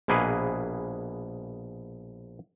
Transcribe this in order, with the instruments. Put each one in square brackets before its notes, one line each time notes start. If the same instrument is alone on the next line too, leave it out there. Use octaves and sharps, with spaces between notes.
[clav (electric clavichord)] A#1 B2 A#3 G#4 B4